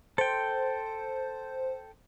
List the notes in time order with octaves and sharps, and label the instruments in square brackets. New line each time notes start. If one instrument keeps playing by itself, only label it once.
[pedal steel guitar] A4 G5 [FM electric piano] C5